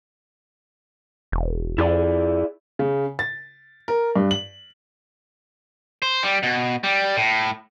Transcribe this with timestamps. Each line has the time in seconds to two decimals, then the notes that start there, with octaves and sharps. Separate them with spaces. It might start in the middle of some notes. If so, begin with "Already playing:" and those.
1.32 E1
1.78 F2 E4 G#4 D5
2.79 C#3
3.19 A6
3.88 A#4
4.16 G2
4.31 F#7
6.02 C5
6.23 G3
6.43 B2
6.84 G3
7.17 A2